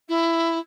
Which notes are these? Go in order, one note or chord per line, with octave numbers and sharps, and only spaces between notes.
E4